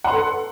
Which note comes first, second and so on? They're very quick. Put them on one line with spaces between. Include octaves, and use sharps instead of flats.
F#5 C6 B4 A4